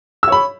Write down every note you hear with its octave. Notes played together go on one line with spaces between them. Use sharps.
C#5 B5 E6